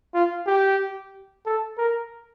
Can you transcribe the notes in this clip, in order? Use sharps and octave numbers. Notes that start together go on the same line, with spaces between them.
F4
G4
A4
A#4